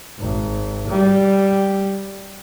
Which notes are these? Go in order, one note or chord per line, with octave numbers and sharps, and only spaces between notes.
G#1
G3